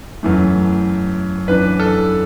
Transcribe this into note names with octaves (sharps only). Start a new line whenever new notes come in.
F#2 E3 A3
F#2 E3 D4 B4
A4